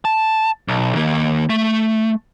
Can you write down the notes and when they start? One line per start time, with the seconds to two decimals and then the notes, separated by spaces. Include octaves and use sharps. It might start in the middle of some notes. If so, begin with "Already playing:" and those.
0.05 A5
0.68 B1
0.95 D#3 A#3
1.50 A3